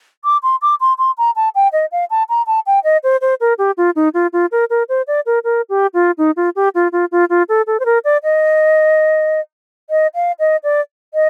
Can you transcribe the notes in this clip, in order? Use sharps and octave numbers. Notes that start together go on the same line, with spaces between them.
D6
C6
D6
C6
C6
A#5
A5
G5
D#5
F5
A5
A#5
A5
G5
D#5
C5
C5
A#4
G4
F4
D#4
F4
F4
A#4
A#4
C5
D5
A#4
A#4
G4
F4
D#4
F4
G4
F4
F4
F4
F4
A4
A4
C5
A#4
D5
D#5
D#5
F5
D#5
D5
D#5